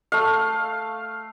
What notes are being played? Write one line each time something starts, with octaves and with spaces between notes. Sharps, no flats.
A3 F5